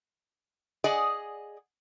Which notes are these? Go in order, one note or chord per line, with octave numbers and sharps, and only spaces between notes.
G#4 D5 D#5 F#5 G#5